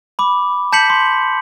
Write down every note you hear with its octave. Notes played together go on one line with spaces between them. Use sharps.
B5 D6
A5 G6 B6 C#7 F#7
C6